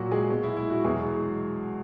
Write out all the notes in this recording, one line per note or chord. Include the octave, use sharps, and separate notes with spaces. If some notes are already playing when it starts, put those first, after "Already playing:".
Already playing: A#2 F#3 F#4
G#3 G#4
B2 G#3
E4
E4
F#4
E2 B2 F#3 G#3 G#4